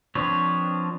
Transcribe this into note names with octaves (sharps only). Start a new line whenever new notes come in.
F3 C4 D4 B4 C#5